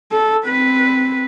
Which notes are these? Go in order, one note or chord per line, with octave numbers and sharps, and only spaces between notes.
A4
C4 B4